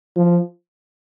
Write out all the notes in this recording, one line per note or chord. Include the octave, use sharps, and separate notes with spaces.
F3